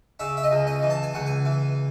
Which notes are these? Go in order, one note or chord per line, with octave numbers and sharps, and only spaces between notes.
C#3 E5
E5
D#5
C#2
D#5
E3
A5
G#5
C#2 F#5
G#5
E3